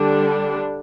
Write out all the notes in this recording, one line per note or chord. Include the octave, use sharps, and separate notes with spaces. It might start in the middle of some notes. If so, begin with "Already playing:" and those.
Already playing: D3 G3 D4